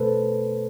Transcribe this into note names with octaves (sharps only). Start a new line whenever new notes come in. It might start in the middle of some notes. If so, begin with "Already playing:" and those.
Already playing: B2 A3 A4 B4 C5